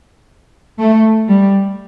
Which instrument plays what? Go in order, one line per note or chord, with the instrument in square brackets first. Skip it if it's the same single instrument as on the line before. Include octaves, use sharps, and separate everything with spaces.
[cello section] A3
G3